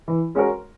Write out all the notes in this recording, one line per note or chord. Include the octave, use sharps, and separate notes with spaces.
E3
G#3 C#4 F#4 A#4